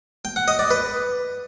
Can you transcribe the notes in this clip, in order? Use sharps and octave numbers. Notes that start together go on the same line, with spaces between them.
G5
F#5
D#5
D5
B4